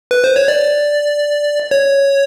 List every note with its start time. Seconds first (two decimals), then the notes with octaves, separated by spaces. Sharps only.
0.11 B4
0.24 C5
0.36 C#5
0.48 D5
1.71 C#5